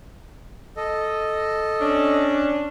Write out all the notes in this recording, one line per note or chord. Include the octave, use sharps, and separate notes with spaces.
A4 D#5
C#4 D4